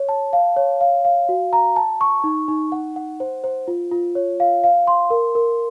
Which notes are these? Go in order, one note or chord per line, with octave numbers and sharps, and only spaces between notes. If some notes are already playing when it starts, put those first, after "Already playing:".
Already playing: C#5
A5
F5
C#5
F5
F5
F#4
A#5
A5
C#6
D#4
D#4
F#5
F#5
C5
C5
F4
F4
C#5
F5
F5
C6
A#4
A#4